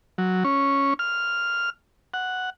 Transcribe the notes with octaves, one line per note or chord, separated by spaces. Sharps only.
F#3
C#4
F6
F#5